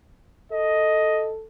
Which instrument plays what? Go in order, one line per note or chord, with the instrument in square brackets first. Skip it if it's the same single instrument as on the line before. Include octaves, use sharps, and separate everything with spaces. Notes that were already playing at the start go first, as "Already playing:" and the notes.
[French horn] A4 [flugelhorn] D#5